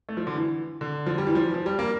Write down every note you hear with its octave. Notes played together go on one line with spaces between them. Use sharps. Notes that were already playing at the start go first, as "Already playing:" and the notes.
A3
F3
D3
E3
D3
F3
G3
E3
F3
F3
G3
A#3